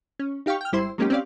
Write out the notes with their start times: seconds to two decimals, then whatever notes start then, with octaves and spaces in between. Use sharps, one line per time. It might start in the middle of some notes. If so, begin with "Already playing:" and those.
0.19 C#4
0.46 D#4 G4 F5 G5 C#6
0.61 G5 F6
0.72 G#1 G3 E4 C5 C6
0.98 F#3 G#3 A#3 C#4 D#4 G4
1.10 C4 C#4 G4 D5 F5